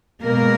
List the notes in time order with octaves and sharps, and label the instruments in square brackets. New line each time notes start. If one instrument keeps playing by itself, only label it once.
[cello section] B2 G#3 A#3 A#4